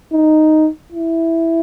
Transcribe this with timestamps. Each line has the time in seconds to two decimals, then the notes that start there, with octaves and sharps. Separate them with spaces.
0.13 D#4
0.92 E4